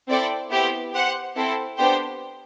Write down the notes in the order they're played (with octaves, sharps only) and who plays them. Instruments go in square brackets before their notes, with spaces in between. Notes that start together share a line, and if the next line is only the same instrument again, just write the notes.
[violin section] C4 E4 A4 D5 G5
B3 E4 G4 C5
G4 C5 F#5
C4 E4 A4 C5
B3 D4 G4 C5 G5